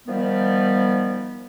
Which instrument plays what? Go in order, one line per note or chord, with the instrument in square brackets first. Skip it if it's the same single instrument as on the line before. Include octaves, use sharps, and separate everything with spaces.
[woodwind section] D#3 F3 G3 B3